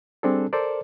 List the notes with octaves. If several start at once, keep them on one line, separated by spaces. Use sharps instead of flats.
G3 C4 D4 G#4 A4
A4 A#4 C5 D5